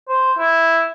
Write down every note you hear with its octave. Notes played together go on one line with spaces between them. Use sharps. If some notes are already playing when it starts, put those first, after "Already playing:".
C5
E4